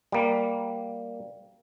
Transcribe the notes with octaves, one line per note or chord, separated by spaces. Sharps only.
G3 A#3